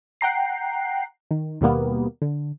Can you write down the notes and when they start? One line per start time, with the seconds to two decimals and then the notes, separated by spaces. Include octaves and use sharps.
0.21 F#5 G5 A#5 C7
1.31 D#3
1.61 D#2 B2 G3 A#3 B3
2.22 D3